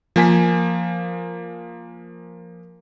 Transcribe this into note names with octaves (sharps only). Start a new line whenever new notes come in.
F3 A#3 G#5 B6